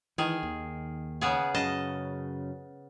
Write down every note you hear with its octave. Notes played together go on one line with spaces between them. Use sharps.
D#3 E3 G#4
D#2
C#3 B3 G#4
F#2 C#3 D#5 A5